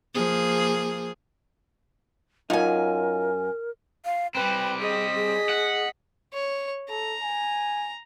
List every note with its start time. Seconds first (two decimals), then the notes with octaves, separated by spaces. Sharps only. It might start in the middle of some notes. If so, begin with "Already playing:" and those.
0.14 F3 A#3 G#4
2.50 F#2 D#4 F4 A#4 G#5
4.05 F5
4.35 G3 C4 B4 G5
4.80 G#4 D#5 B6
5.15 G#4
5.49 F#5
6.33 C#5
6.89 A4 A#5
7.22 G#5